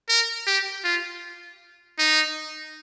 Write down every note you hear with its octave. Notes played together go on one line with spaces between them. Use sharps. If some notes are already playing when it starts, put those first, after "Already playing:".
A#4
G4
F4
D#4